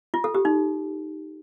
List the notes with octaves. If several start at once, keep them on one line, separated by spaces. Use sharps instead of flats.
F4
A4
G4
D#4